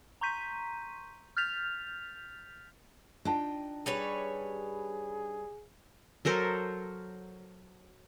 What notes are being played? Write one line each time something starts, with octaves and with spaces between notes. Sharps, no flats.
A#5 C6 C#6 G6 B6 D#7
F6 G6 A6 B6 F7
D4 D#4 F4 G5 A5
G3 G#4 B4 C#5
F#3 A4 A#4 C5